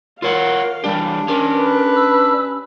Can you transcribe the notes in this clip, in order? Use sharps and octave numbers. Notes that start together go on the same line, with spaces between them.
F4 A#4 C#5 F5 F#5 C6
E3 G3 D4 G4
C#4 G4 A#4
B4
E6